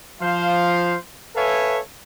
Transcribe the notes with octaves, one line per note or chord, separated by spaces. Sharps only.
F3 C5 F5
A4 B4 C#5 E5 F5 G#5